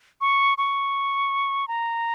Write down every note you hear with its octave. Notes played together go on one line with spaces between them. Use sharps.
C#6
C#6
A#5